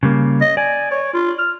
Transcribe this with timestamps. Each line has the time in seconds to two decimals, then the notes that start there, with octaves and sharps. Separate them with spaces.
0.03 C#3 G3 A#3
0.41 D#5
0.57 D5 G#5
0.91 C#5
1.14 F4
1.38 F6